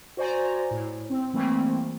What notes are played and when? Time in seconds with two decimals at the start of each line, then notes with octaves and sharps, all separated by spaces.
0.17 F#4 C5 D5 G#5 A#5
0.71 A2
1.10 C4
1.33 E3 G3 A3 A#3 C4